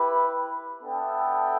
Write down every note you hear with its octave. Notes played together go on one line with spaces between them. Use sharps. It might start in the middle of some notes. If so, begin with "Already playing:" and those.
Already playing: E4 G4 B4
B3 D4 A4 E5 G5